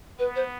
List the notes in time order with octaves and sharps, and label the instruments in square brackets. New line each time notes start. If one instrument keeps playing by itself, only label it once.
[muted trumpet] B3 [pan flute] B4
[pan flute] C5